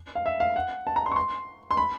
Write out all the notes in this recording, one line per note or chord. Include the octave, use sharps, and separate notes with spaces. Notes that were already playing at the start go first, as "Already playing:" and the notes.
F5
E5
F5
F#5
A5
A#5
C6
C#6
C6
C6
B5